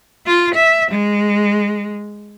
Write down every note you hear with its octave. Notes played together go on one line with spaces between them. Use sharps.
F4
E5
G#3